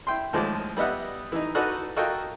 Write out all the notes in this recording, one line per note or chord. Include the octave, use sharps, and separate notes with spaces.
E4 G5 C6
D#2 A2 F3 G#3 A5 D6
G3 B3 D#5 E5 F#5
E3 D#4
D#4 F#4 A4 B4 D5 F#5
F4 F#4 A4 A#4 D#5 G5